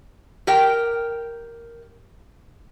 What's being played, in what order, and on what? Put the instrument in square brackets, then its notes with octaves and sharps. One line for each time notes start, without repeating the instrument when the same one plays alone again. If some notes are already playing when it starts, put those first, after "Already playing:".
[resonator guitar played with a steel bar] G4 A#4 G5